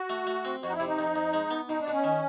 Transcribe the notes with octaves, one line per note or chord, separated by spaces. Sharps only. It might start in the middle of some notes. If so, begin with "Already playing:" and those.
Already playing: F#4
A3
A3
C4
F2 F#4
D#4
E4
C3
D#4
F2
F2
G#3
B3
B2 D#4
D4
B2
C#4
D#3